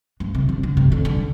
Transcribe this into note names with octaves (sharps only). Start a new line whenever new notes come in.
G2
C3
D3
D3
C3
D3
D3